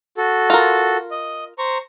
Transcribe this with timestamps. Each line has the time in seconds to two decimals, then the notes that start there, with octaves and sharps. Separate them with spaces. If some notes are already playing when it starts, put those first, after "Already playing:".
0.17 F#4 A4
0.50 F4 A#4
1.11 D#5
1.59 C5 A#5 C#6